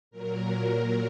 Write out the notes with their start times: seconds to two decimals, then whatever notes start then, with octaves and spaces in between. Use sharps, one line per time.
0.11 A#2 F#3 A#4